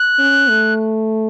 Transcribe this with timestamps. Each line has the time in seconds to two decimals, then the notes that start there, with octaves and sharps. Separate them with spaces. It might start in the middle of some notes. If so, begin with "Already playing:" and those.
Already playing: F#6
0.19 C#4
0.49 A3